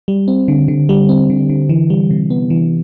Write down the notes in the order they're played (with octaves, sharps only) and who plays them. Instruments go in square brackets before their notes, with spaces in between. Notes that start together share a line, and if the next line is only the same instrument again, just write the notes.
[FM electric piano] G3
C4
D3
D3
G3
C4
D3
D3
E3
G3
C3
B3
E3